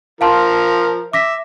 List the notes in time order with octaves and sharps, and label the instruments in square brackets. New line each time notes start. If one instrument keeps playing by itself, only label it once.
[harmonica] F3 A#4 [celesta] F5 A5 C6
[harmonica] E5 [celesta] D6 A#6 B6